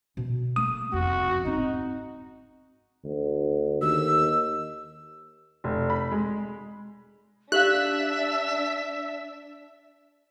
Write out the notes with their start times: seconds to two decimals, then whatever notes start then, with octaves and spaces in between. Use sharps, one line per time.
0.17 B2
0.56 A3 A#3 D#6
0.93 F1 F2 F#4
1.45 G#2 C4 D#4
3.05 D2
3.82 D#2 E6
5.64 F1
5.90 B5
6.12 G#3
7.52 D4 G4 E5 F5 F#6